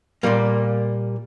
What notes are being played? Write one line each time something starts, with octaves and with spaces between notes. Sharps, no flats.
A#2 G3 A#3